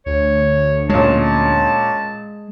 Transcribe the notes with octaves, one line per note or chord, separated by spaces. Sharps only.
D2 C#5
A#2 G#3 C#4 A5